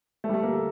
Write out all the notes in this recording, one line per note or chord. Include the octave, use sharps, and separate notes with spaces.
A3
G3
A3
A#3
A4